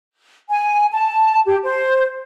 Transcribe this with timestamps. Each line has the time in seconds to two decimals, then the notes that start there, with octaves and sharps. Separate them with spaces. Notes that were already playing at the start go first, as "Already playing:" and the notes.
0.49 G#5
0.92 A5
1.46 G4
1.63 C5